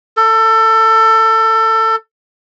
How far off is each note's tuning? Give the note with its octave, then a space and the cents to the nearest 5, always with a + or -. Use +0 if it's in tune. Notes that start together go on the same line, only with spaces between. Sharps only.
A4 +25